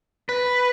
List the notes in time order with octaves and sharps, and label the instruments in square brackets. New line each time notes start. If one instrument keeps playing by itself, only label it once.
[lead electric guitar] B4